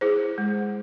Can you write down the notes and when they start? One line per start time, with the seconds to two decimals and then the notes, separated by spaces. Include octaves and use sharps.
0.01 E4 G#4 C5
0.38 G#3